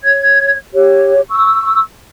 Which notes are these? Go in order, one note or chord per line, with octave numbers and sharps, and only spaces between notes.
C#5 G#6
G4 C#5
C#6 E6